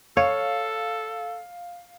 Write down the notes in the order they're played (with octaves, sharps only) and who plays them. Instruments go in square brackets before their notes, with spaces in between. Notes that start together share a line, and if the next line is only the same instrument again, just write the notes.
[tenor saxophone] A4 [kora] C#5 [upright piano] F5